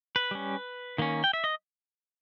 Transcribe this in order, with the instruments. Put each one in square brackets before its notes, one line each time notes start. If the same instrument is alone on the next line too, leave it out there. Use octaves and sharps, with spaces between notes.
[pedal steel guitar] B4
G3 C#4
D#3 A#3 C#4
G5
E5
D#5